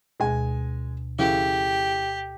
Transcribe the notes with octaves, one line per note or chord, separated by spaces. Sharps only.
D2 B2 G#3 G#5
C#3 E3 G4 A4